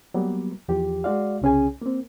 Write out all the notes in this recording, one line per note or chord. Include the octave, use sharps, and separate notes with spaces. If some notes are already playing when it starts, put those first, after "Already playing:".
F#3 G3 A#3 B3
E2 F3 G4
G#3 F#4 D5 F5
C2 C#3 C#4 G#4 G#5
A#3 C4